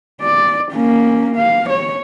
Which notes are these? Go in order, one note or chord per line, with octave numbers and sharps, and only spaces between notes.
D5
A#3 C#4
F5
C#5